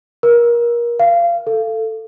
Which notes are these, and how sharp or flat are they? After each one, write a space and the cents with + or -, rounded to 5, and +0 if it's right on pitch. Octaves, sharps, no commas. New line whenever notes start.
A#4 +25
F5 -25
A4 +10